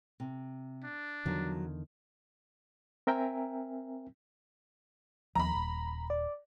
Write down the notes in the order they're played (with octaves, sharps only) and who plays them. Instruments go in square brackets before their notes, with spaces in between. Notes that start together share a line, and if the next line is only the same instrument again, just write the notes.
[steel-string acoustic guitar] C3
[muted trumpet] D4
[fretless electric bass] E2 D3 D#3 [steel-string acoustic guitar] F3 F#3
[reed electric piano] C4 A#4 E5 G5 G#5 A#5
[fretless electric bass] D#2 F3 [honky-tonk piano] A#5 B5
[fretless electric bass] D#1
[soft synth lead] D5